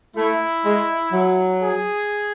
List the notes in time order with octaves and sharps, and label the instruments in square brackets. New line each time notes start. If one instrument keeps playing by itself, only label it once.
[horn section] A3 [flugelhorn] E4
[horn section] G#3
F#3
[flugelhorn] G#4